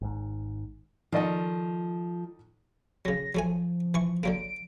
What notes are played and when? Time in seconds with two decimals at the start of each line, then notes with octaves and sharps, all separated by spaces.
0.02 G#1 G#2
1.12 D#3 F3 A4 D5 D#5
3.05 C#3 F#3 A#6
3.35 F3 F#3 A3 G#5
3.94 E3 C#6
4.23 D3 F#3 A#3 D7